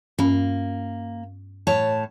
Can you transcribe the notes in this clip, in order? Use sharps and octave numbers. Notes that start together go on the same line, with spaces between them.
G2 A#3 C#4
A2 C#5 A5